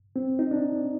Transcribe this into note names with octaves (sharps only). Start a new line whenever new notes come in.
C4
D#4
D4